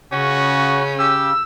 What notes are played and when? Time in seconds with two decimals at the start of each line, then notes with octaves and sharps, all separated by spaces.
0.12 C#3 C#4 F#4
0.99 G4 E6